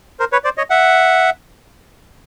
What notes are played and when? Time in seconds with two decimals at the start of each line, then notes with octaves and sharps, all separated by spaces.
0.20 A#4 C5
0.32 B4 C#5
0.44 C5 D5
0.58 C#5 D#5
0.70 E5 F#5